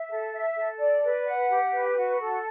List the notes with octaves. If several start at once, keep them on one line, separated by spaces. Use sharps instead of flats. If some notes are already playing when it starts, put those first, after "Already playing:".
Already playing: E5
A4
E5
A4
D5
B4
F#5
G4
B4
F#4
A4